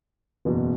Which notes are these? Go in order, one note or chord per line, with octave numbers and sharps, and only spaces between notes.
F#1 E2 B2